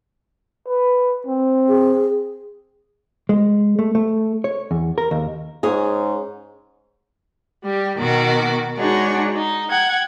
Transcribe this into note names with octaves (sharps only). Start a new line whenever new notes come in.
B4
C4
G#4
G#3
A3
A3
C#5
E2
A#4
D#2
G#2 C#4 G#4
G3 G4
B2 D#3 F#4 D6
G#3 D4 D#4 F#4 G#4 C#5
D#4
F#5 G5 G#6